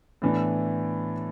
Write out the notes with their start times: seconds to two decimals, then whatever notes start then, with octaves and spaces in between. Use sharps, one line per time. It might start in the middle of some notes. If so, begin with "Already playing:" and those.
0.22 A2 E3 B3 D4